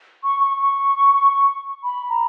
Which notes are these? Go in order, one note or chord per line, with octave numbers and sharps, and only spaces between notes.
C#6
C#6
C#6
B5
A#5